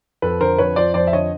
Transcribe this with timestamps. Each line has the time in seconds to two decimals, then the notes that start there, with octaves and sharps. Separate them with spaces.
0.22 F2 A4 B4
0.41 D3 A#4 C5
0.58 F2 B4 C#5
0.76 F3 C5 D5
0.94 F2 C5 D5
1.07 E5
1.13 D3 C#5 D#5